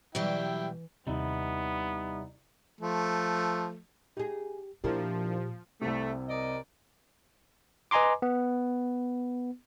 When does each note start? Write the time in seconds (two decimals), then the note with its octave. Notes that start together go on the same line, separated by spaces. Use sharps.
0.15 B2 E3 F#3 G3 E4 G4 D5 G5
1.07 D#2 C3 G3 B3 D#4 E4
2.81 F3 A3
4.17 D#4 G4 G#4
4.84 A#2 F3 D4 E4 G4 A#4
5.81 C2 C3 A3
6.29 A#4 D5 D#5
7.91 B4 D#5 G#5 A#5 C6 D6
8.22 B3